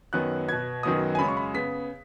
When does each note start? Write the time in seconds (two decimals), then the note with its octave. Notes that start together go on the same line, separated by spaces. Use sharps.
0.13 F#2 D#3 F#3 B3 F#6
0.48 B2 B3 G#6
0.83 F#2 D#3 F#3 B3 D#6
1.15 G#5
1.19 F#2 C#3 G#3 C#4 B5
1.28 C#6
1.37 B5
1.54 C#3 B3 B6